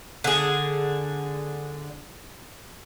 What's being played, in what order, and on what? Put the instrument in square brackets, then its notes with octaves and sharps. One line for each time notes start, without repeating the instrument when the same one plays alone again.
[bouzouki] D3 G#4